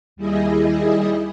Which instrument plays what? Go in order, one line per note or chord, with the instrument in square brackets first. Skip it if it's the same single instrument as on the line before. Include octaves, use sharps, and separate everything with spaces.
[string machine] D#2 G3 E4 G#4 D#5